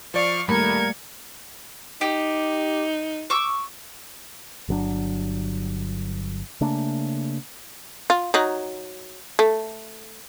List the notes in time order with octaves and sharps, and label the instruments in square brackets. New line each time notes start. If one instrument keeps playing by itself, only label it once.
[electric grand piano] F3 D5 [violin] F5 C#6
[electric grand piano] D#2 B5 [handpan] G3 A3 A#3 [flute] A#4 [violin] G#6 C#7
[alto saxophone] D#4 [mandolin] G4
[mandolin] C#6 D6 E6
[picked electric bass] G1 F#3 C4 D4
C#3 A3 A#3 D4
[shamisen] F4
F#3 D#4
A3